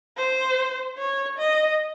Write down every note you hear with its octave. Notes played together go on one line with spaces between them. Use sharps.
C5
C#5
D#5